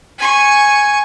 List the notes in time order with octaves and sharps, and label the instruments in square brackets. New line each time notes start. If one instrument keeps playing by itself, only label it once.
[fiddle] G#5 C#6